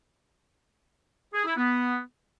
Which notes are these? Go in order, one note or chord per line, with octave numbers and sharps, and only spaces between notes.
G#4
E4
B3